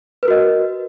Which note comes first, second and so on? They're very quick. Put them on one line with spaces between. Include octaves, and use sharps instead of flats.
B4 A#4 F#4 D#5